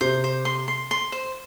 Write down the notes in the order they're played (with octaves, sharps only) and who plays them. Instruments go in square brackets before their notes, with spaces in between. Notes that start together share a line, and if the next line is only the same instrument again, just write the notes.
[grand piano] C3 [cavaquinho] C5
[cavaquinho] C5
C6
C6
C6
C5